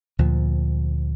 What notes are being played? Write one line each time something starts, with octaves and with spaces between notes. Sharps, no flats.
D2 A#2 F3